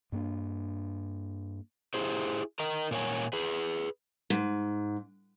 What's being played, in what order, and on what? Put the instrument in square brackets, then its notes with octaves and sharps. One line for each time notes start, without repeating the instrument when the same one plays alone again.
[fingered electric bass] G2 A#3 C4 D4
[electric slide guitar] E4 G4 G#4 C5
A#4 D#5 A#5
A#2 A#4 C#5 G#5
G#4 B4
[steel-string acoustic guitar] G#2